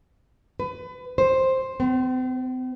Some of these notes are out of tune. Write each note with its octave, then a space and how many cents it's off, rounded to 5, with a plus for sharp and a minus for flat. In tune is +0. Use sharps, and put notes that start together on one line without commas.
B4 +30
C5 +5
C4 -40